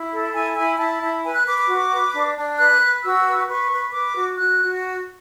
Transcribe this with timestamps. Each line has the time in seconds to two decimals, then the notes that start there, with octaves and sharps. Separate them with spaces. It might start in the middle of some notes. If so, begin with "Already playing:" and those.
Already playing: E4
0.11 A4
0.34 E4 G#5
0.56 E4 G#5
0.79 E4 A5
1.02 E4
1.24 B4 G#5
1.35 F#6
1.47 B4 D6
1.57 D6
1.68 F#4
1.92 B4
2.13 D4
2.36 D4
2.58 B4 F#6
2.81 B4
3.03 F#4 E6
3.26 B4
3.48 B4 C#6
3.71 B4
3.93 B4 D6
4.16 F#4
4.38 F#4 F#6
4.61 F#4